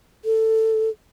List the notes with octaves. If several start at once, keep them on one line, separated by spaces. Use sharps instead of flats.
A4